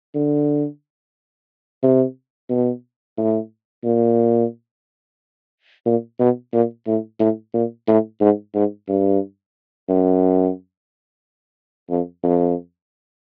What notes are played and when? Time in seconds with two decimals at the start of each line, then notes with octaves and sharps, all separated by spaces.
0.15 D3
1.83 C3
2.50 B2
3.17 A2
3.84 A#2
5.85 A#2
6.19 B2
6.53 A#2
6.87 A2
7.20 A2
7.53 A#2
7.87 A2
8.20 G#2
8.54 G#2
8.88 G2
9.89 F#2
11.90 F2
12.23 F2